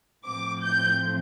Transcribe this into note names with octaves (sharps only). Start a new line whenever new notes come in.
A2 F3 C4 D6
G6